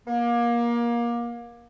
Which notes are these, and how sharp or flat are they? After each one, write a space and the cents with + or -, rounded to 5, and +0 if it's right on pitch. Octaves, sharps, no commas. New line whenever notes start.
A#3 +25